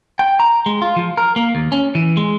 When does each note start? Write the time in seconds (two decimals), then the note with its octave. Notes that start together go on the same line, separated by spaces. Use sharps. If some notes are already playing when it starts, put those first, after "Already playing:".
0.19 G5
0.40 A#5
0.66 G#3
0.82 F4
0.96 F3
1.17 A#4
1.36 A#3
1.55 D#2
1.72 C#4
1.95 E3
2.17 G#3